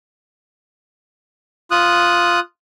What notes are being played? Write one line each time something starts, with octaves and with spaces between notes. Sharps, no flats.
F4 D#6 F#6